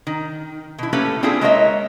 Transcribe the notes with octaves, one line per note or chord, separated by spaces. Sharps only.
D#3
B2 E4
A3 A#3 C#4 G4 A4 B4
C4 D4 E4 F4 G#4 A4
G#3 A#3 A#4 C#5 D#5 E5